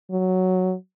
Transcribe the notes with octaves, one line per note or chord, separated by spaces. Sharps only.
F#3